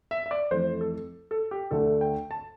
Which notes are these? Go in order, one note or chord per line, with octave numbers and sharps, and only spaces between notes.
E5
E5
D5
F2 E3 A3 C5
A4
A4
G4
D2 D3 A3 A4
G5
A5